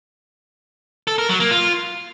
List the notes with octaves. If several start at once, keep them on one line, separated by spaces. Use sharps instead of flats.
A4
A#4
F#3
A#3
F4